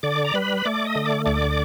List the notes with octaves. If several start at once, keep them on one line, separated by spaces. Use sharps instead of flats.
D3 D5 D6
A#5
G3 B4 B5
A3 D5 D6
D#5 D#6
D3
D5 D6
D2 D5 D6